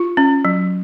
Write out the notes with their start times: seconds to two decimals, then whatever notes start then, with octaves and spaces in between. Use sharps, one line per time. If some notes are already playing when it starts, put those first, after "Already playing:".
Already playing: F4
0.17 C#4
0.45 F#3